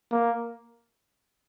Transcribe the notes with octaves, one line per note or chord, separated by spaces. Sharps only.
A#3